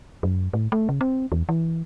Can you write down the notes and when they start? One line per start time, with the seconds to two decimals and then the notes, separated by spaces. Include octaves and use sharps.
0.23 F#2
0.53 A2
0.72 A3
0.89 C#3
1.01 C4
1.32 E2
1.49 E3